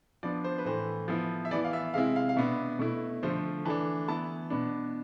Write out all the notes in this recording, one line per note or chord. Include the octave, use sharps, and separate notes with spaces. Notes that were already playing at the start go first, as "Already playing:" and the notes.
F3 B3 D4 D5
C5
B4
A2 E3 A3 C5
F3 B3 E4
E5
E3 B3 E4 D5
F5
E5
C3 G#3 C4 E4 F5
F5
F5
B2 B3 D4 E5
B2 A3 E4
D3 F3 A3 C5
E3 A3 D4 A5
E3 B3 E4 A5
B2 B3 D4